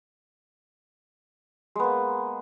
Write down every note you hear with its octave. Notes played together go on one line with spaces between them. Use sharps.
G#3 A#3 B3